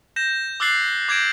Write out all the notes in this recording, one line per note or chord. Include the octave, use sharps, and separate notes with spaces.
G6 A#6 E7
D6 E6 F#6 A6 C7 F#7
D6 G6 G#6 A#6 D7 E7